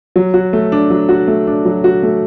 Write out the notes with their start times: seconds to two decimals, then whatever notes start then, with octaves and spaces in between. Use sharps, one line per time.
0.16 F#3
0.34 F#4
0.53 A3
0.72 D4
0.90 F#3
1.09 F#4
1.28 A3
1.47 D4
1.65 F#3
1.84 F#4
2.03 A3